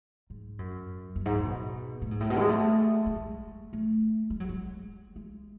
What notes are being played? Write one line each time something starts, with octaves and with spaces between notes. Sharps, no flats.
G#2
F#2
F#2
G#2
D#3
B2
A2
G#2
A2
B2
G#3
A3
A3
G#3
A3
G#3
F#3
G#3
G#3